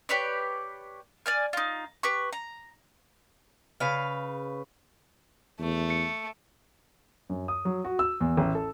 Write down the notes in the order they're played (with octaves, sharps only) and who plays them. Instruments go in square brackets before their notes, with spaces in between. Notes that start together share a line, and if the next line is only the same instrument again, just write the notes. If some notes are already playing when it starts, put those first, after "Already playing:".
[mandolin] G4 B4 C#5 D5
D5 G#5 F6
D#4 F4
G4 B4 C#6
A#5
[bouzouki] C#3 B4 F5
[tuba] E2 [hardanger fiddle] A3
[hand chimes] C#7
[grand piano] F#2
D#6
F#3
F#4
E6
E2
A1
A4